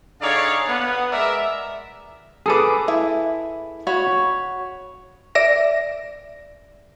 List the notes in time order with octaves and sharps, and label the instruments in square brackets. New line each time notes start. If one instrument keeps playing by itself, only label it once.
[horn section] D3 D#4 G#4 C#5 D5 F5
B3
G#3 A#4 D5 E5
[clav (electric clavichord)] G#4 A4 B4 [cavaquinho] D6 D#6
[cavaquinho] E4
F#4 C#5 B5
[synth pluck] D5 E5 A#6